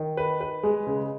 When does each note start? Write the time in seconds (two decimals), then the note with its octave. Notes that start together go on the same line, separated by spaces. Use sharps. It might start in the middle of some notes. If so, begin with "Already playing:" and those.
Already playing: D#3
0.17 B4
0.41 B4
0.63 G#3
0.87 C#3